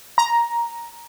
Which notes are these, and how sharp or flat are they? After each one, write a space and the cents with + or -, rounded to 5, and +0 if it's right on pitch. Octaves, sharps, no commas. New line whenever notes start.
A#5 +5